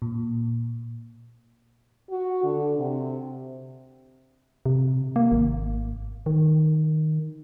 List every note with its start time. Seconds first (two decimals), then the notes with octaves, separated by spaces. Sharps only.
0.02 A#2
2.10 F#4
2.44 D3
2.79 C3
4.66 C3
5.16 A#3
5.32 G#1
6.26 D#3